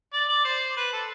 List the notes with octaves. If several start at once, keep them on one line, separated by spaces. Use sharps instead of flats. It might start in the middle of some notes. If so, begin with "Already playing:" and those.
D5
D5
C5
B4
A4